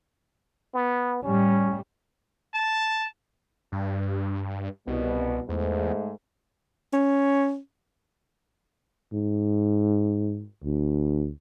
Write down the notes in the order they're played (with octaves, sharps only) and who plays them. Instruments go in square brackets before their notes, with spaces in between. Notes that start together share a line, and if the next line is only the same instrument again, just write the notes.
[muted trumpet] B3
[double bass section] A2 G3 [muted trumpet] C#4
[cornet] A5
[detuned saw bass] G2
[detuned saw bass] C2 [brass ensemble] B2 G3
[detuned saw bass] E2 [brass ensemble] G#2 A3
[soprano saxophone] C#4
[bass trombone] G#2
D2